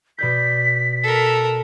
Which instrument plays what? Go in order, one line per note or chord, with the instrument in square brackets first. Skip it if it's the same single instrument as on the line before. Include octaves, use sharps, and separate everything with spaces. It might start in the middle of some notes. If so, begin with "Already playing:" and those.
[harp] B2 D5 G6 [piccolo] B6
[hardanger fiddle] A4 A#4